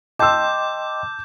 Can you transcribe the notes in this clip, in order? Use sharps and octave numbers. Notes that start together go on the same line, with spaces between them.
D#5 G5 A5 C6 D6 E6 G6